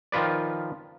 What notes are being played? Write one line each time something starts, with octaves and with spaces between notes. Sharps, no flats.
D#3 F3 F4 B4 D5